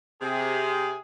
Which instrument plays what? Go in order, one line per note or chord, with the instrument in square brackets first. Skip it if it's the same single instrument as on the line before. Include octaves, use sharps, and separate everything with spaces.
[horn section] C3 G#4